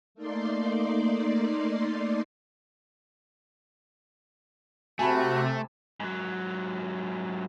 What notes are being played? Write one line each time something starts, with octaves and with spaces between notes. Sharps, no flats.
A3 A#3 D#4 D5 C6
C3 A3 F#4 G#5 A5 B5
G#2 F#3